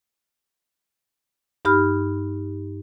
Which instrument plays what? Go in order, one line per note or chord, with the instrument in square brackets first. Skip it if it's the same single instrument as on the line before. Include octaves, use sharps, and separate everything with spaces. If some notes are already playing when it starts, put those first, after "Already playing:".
[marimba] G2 D#4 G4 B5 F6